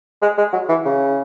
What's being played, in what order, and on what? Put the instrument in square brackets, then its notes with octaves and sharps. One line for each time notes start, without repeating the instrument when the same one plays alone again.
[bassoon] G#3
G#3
F#3
E3
C#3